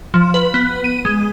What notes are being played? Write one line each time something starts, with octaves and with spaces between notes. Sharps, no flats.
F3
B4
B3
D#7
G#3